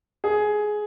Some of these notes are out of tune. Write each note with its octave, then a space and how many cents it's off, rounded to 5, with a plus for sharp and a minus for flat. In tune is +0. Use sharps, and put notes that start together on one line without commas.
G#4 +15